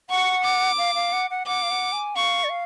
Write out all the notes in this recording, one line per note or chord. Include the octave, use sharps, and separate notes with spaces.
F#5 C#6
D6
F5
F5
F#5
F#5
F#5 D6
F5
F#5
G#5
F5 C#6
D5
F5